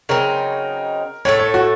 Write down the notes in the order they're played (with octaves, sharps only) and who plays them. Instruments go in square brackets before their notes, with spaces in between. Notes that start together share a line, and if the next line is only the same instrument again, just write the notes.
[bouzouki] C#3 F#3 C4 D#4 [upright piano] A#4
[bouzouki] A2 A3 D#4 A4 [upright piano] C#5
[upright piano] C#5
F#4